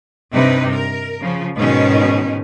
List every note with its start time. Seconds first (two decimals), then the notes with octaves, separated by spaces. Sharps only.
0.32 G2 C3 D#4 B4
0.74 A#4
1.21 C#3 F3
1.55 G#2 B2 D#3 C#4